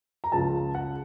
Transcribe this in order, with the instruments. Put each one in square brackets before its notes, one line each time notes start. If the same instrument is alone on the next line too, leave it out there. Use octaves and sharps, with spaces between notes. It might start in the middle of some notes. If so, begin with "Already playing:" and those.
[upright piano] A#5
C#2 C#3 F3 A5
F#5